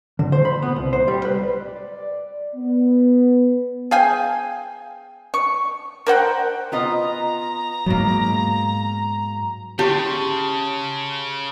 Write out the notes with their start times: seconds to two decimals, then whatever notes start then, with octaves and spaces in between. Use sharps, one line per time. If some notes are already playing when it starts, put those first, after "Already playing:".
0.19 D3
0.32 C5
0.45 B5
0.62 B3
0.76 C2
0.93 C5
1.08 G3
1.25 B4
1.61 D5
2.56 B3
3.91 G#4 F5 G5 G#5
5.34 C#6
6.06 A#4 C5 F#5 G5
6.72 B3 F4 D#5 A#5
7.86 G#2 B2 F#3 A#3
9.79 C#3 G4 A5 C6 C#6